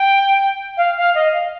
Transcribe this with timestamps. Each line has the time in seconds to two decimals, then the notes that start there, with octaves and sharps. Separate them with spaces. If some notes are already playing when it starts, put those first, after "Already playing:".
Already playing: G5
0.77 F5
0.97 F5
1.15 D#5
1.34 F5